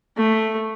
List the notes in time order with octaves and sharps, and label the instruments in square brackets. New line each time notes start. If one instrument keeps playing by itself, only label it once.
[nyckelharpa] A3